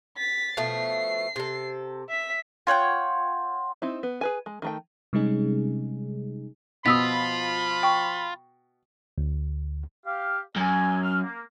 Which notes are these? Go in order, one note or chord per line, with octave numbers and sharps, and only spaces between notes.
A6 B6
B2 F3 A3 C7
C3 A4
E5 B6
F4 C#5 F#5 G5
C4 D#4 E4
B3
G#4 B4 G#5
G#3
D#3 A3 G5
C3 G3 G#3 C#4 D#4 G#4
B2 F3 F4 B5 D#6 E6 B6
G5 C#6
D2
G4 F5
F#2 G#5
F6
A#3